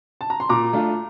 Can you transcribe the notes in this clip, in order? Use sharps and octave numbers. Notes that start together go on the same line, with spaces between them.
A5
A#5
C6
A#2 A#5 D6
A3 D4 F4